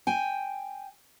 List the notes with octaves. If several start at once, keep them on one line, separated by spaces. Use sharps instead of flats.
G5 G#5